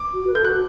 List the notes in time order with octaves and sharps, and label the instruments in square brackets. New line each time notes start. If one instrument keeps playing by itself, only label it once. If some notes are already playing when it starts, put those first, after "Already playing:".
Already playing: [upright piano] D6
[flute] F#4
B4
[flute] A4 [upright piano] G6
[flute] F#4 [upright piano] F#6